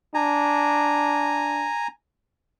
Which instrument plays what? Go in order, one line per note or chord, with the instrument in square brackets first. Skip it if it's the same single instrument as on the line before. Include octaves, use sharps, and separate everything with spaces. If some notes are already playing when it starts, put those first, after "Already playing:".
[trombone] D4 [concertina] G#5 A#5